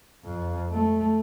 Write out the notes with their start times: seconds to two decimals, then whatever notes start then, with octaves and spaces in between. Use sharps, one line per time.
0.24 F2
0.71 A3